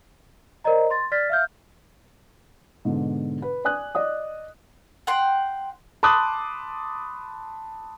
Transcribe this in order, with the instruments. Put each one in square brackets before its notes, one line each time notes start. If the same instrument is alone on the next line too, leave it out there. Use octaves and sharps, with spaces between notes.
[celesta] A#4 C5 D5 D#5 A#5
C6 A6
D5 F6 A6 B6
E5 F5 F6 G6
[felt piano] G#2 B2 D3
B4
D5 G#5 D#6 F#6
D5 D#5 D#6
[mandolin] F#5 G5 C6
[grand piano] A5 B5 C6 D6 D#6 F#6